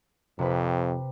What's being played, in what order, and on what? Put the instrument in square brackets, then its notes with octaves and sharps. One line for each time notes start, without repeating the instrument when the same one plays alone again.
[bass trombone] F2 [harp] C3 B4